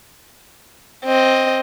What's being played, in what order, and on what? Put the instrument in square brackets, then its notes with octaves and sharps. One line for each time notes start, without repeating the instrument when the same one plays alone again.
[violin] C4 D#5